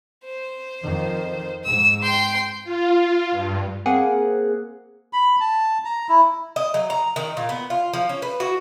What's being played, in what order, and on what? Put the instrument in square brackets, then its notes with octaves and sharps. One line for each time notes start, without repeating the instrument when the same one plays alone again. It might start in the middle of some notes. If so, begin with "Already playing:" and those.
[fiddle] C5
[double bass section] F2 D#3 F3
[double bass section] G#2 [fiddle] E6
[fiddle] G5 C6
[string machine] F4
G2
[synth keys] A#3 C4 G#4 F#5
[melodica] B5
A5
A#5
E4
[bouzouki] D#5
F#3
A#5
D#3
A#2
B3
F4
F3
C#4
B4
F#4